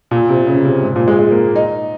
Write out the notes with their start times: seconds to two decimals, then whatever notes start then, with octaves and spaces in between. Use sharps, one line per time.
0.11 A#2
0.29 C3
0.44 C3
0.47 C#3
0.65 C3
0.83 G#2
0.96 A#2
1.08 G#3
1.19 G#3
1.31 A#3
1.56 D#4